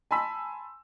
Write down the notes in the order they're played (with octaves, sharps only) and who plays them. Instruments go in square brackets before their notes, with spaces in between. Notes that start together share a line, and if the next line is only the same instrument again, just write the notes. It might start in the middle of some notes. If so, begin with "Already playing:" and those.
[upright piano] G#5 A5 B5 C6 E6 B6